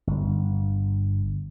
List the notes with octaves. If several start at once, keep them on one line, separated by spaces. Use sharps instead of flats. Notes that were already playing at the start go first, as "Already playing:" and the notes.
G1